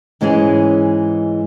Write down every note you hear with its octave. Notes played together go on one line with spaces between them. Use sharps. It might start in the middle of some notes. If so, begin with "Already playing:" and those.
G#2 E3 G#3 C#4 G#4